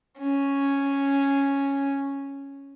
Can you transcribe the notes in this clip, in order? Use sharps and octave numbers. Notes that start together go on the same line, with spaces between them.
C#4